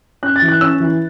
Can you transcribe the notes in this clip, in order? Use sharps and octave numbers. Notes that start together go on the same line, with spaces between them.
C#4 F#6
A6
E3
F#6
C#4 E6
E3